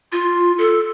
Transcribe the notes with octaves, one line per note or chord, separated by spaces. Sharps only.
F4
A4